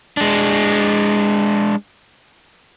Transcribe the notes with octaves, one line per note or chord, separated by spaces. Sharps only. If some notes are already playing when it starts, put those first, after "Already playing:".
G#3 D4